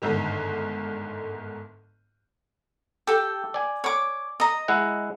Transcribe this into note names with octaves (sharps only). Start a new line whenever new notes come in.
G1 G#2 D3 D#3
G4 A4 G5
D5 G#5
C#5 D6
D#5 A#5
G#3 E4 F#5